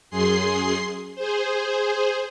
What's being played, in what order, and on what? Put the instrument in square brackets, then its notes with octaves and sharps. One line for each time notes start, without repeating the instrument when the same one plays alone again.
[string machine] F#2 G#4 C6 C7
G#4 C5